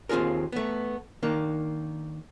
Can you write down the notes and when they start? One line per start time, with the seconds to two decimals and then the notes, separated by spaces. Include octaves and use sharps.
0.09 D#2 C4 F4 G#4 A#4
0.52 A3 B3
1.23 D#3 A#3 D4